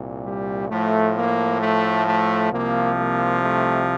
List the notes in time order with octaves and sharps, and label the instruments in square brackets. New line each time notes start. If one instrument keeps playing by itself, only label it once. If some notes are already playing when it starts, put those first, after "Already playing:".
Already playing: [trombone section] C2 A#2
G3
A2 F3 A3
A#3
A3
A3
C2 C3 F3 A#3
A#3
A3